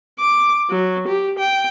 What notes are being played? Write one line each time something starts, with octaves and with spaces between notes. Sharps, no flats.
D6
F#3
G4
G5